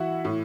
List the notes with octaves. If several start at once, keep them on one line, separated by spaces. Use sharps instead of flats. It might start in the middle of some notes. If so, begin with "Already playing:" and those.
Already playing: E3 E4 F#4 E5 F#5
A2